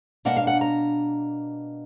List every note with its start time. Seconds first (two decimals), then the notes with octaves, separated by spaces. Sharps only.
0.25 B2 A#3 D4 F#5
0.36 F5
0.47 F#5
0.61 A#5